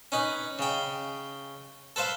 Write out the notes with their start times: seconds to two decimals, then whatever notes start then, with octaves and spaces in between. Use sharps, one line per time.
0.12 C#4 D#4 B4
0.59 C#3 G5
1.96 A4 B4 C5 F5